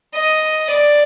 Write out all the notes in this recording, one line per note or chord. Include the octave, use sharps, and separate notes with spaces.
D#5
D5